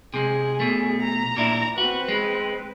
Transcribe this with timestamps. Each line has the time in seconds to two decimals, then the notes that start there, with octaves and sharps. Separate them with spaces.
0.14 C3 G#3 G#4
0.60 B2 A3
1.03 A#5
1.37 A#2 D4 E4
1.78 C4 F#4 B4
2.08 G#3